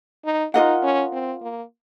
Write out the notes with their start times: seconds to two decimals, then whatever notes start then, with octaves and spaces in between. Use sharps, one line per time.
0.25 D#4
0.54 D#4 F4 A#4 D#5 F#5
0.83 C#4
1.13 C4
1.42 A#3